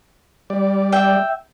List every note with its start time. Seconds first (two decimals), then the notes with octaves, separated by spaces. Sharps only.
0.50 G3 D5
0.92 E5 G5